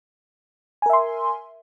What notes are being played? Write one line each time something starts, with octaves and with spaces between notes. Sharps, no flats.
A#4 E5 G#5 C6